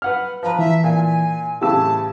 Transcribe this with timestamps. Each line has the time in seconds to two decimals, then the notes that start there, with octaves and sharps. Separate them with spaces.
0.02 B4 F#5 F6
0.43 F3 B4 A#5
0.59 E3 E5
0.84 A#2 G#5
1.62 A2 C#3 E3 G4 A5 E6